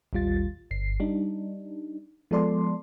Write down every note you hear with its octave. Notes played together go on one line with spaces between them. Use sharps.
A1 D#2 G3 F4 A6
G1 C7
G3 D4 D#4
F3 G#3 B3 A4 D5 C6